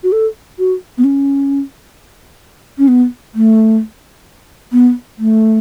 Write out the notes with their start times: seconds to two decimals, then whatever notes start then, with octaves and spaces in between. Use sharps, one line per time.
0.03 F#4
0.12 A4
0.59 F#4
0.98 B3
1.04 C#4
2.78 C#4
2.88 B3
3.35 A3
4.72 B3
5.19 A3